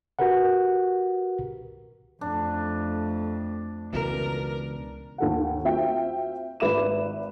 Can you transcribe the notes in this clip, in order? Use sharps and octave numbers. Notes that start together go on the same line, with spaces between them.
F#4 G4 A#4 B4 F#5
F2 A3 D4
C#2 B2 E3 A#4
D#2 A4 F#5
C4 F4 F#4 E5 G5
G#1 B4 E5 D6 E7